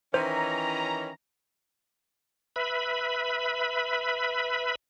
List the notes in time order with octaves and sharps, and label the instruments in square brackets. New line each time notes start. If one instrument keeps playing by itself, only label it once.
[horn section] D#3 E3 C#4 [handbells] C5 [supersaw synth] A#5
[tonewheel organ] B4 E5 B5